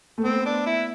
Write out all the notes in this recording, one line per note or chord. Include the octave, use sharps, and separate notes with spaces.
A3
B3 C4
D4
E4